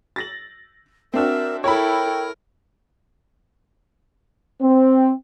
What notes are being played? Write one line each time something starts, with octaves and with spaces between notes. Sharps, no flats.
A6 A#6 F#7
C4 D4 F#4 A#4 E5
E4 A4 A#4 C#5 G5 B5
C4